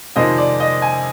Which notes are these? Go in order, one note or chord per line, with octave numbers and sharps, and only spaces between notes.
F2 C3 D#3 G#3 C4 D#5
D5
D#5
G#5